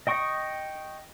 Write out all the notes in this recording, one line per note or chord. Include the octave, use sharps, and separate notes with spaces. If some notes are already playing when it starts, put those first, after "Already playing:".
D#5 G5 C#6 D#6